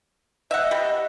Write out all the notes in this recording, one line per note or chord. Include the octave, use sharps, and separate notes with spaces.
D#5 E5 F#5
G3